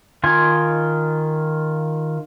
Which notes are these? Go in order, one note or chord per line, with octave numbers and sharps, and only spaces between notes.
D#3 F4 G#5